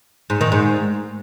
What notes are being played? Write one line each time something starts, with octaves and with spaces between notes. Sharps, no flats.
G#2
D#3
G#2